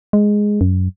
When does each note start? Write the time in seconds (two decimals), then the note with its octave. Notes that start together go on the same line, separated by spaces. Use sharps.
0.13 G#3
0.61 F#2